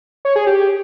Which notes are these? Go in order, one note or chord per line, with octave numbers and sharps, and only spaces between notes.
C#5
G#4
G4